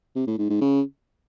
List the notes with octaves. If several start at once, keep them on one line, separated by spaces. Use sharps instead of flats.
C3
A2
G#2
G#2
C#3